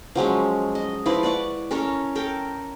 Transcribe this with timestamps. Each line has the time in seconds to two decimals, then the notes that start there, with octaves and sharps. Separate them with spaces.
0.15 F3 F#3 G#3 C#4
0.75 D#5
1.06 F3 E4 B4 D5
1.23 D5 F#5 C#6
1.71 C#4 A4 A#4 C#5
2.15 A4 A#4 G5